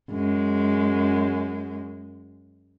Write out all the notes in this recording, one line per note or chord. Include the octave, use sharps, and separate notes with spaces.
F#2 G#3